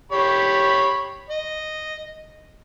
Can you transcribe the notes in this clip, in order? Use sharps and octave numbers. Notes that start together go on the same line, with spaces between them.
G4 C#5 B5
D#5